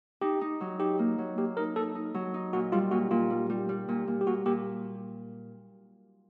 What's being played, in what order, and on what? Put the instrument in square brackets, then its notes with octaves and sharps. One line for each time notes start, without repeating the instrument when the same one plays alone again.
[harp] D#4 [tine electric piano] G4
[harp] D#4
F#3
[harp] D#4 [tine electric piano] G4
[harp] A#3
F#3
[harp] A#3 [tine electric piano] G4
[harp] D#4 [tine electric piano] A#4
[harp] D#4 [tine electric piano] A4
[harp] D#4
F#3
D#4
[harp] A#2 [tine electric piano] F#4
[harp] G3 [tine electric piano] F4
[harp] A#2 [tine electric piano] F#4
[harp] A#2 [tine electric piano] F4
[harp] G3
G3
G3
A#2
A#2
[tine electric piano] G4
[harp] A#2 [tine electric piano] F#4
[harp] A#2 [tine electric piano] G4